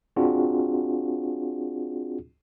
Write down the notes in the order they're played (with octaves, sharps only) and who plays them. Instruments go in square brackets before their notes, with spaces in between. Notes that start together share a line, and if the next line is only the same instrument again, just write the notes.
[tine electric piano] C4 D4 F4 F#4 G#4